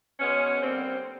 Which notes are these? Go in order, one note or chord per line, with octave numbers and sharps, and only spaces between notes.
B2 G#3 B3 C#4
D3 G3 A#3 C4